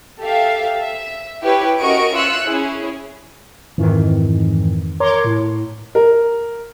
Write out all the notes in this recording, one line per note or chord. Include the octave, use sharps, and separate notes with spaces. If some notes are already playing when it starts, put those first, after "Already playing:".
G4 A4 E5 F5
E5
E4 G4 B4 C#5 G5
C#4 F#4 A#4 D#5 C#6 D7
F4 E5 E6 F#6 C#7
C#4 E4 G#4
F2 G#2 D#3 E3
A#4 C#5 A#5 C6 D6
A2
A#4